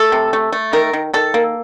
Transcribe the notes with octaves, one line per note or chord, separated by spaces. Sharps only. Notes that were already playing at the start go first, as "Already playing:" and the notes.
Already playing: A3 A4
C3
A3
A3
D#3 A#4
D#3
D#3 A4
A#3